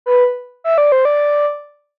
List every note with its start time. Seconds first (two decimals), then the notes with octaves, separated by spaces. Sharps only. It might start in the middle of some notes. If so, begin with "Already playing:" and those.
0.06 B4
0.64 E5
0.78 D5
0.92 C5
1.05 D5